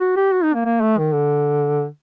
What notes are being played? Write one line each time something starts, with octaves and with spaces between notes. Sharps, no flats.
F#4
G4
F#4
D#4
A#3
A#3
A3
D#3
D3